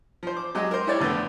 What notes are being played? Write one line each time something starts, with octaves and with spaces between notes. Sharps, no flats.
F3 C5
D6
F#3 G#3 G4 D#5
A#4 C5
E4 G4 C#5 D5
F2 D3 A3 B3